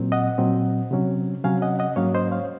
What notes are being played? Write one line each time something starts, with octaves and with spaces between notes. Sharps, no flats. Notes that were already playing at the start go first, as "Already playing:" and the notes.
Already playing: A#2 F#3 C4
D#5 F#5
A#2 F#3 C4
C3 F#3 C#4
C3 F#3 C#4 F5 G#5
D#5 F#5
D#5 F#5
G#2 F#3 A#3 C#4 C#5 F5
C5 D#5
C#5 F5